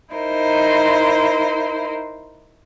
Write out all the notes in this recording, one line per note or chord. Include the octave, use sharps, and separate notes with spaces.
D#4 E4 A#4 C5